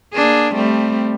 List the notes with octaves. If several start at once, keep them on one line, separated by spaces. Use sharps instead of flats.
A#3 D4 G#4
G3 A3 C4